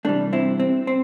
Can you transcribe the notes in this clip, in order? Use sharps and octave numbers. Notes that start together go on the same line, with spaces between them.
C3 E3 G3 A3 D4
C4 E4
C4
C4